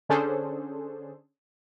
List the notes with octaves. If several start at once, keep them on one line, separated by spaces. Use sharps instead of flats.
D3 C#4 D4 G#4 A4 C5